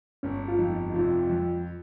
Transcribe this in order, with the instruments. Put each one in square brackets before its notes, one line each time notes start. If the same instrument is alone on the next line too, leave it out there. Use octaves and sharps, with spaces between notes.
[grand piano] G1 [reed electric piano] C#4
[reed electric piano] F4
[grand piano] F2 [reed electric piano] D#4
[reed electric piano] D#4
[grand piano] F1 [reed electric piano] F4
[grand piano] F2